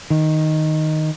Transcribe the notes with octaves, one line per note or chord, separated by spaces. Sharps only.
D#3